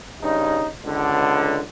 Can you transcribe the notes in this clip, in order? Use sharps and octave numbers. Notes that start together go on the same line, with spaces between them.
G2 C#3 D#4
C#2 D3